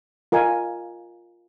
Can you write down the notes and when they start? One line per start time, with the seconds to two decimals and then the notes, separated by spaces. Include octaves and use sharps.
0.32 F4 A#4 D#5 G#5